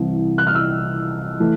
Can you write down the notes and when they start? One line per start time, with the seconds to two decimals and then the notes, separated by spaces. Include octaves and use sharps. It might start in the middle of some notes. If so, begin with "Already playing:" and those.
Already playing: C2 C3 E3
0.38 F#6
0.47 F6
0.55 E6
1.40 E3 A3